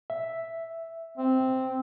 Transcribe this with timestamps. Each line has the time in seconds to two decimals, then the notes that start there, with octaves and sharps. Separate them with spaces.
0.10 E5
1.18 C4